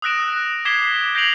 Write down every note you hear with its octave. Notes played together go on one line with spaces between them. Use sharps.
D#6 E6 F#6 A#6 D7 E7
D6 G#6 B6 C7 E7 G7
G6 A#6 C7 D7 F7 F#7